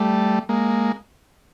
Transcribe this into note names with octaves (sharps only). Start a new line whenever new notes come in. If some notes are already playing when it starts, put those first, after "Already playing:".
Already playing: G3 A3
G#3 A#3